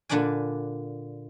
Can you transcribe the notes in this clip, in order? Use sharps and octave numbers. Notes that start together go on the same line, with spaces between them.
A#2 D3 D4 B4 D5 G#5